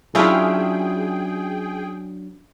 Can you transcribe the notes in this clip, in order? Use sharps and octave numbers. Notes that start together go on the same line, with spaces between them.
F#3 C#4 D4 E4 F4 G#4 G5